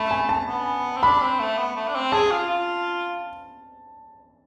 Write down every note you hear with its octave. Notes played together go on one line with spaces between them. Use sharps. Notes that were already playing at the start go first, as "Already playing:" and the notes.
Already playing: A3 B5
G#5
A5
B3
C4
D4 B5
C4
A3
B3
A3
D4
C4
G#4 A5
F4
F4